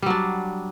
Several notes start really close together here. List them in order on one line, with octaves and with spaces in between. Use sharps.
G3 F#3 D4